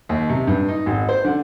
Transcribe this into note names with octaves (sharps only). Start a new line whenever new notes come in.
D#2
C3
G2
D#4
G#1
C5
D3